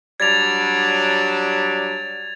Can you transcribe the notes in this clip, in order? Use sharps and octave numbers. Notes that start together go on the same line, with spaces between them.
F#3 G3 D4 G#6 A6 F7